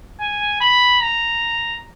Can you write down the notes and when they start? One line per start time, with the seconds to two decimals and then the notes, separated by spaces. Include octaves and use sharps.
0.20 G#5
0.61 B5
1.01 A#5